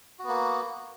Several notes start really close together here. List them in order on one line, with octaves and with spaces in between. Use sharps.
F#4 B3 A#3